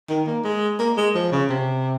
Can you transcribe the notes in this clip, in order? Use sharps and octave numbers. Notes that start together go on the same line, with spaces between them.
D#3
A#3
G#3
A#3
G#3
F3
C#3
C3